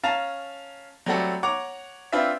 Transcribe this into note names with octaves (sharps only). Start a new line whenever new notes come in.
C#4 F5 A5 A#5
F#3 G3 A3 C4 F#4 A4
C#5 F#5 A#5 D6
C4 D4 F4 B4 E5